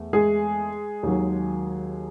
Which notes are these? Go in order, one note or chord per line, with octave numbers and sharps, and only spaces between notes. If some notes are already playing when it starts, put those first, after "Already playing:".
Already playing: E2 A3
G#3 G#4
D#2 D#3 F#3